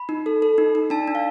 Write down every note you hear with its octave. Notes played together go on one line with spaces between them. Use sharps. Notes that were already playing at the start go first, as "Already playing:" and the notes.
Already playing: B5
D#4
A4
A4
D#4
D#4
D4 A5
D4
F5